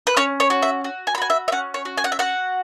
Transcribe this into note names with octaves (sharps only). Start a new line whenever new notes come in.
B4
C#4 C#5
C#5
F#4
E5
F#4
G#5
B5
F#4 G#5
E5
E5
C#4 F#5
C#5
F#4
G#5
F#5
E5
F#4 F#5